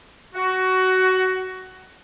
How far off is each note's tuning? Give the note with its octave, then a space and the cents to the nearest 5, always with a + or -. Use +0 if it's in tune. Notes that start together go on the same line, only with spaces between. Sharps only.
F#4 +15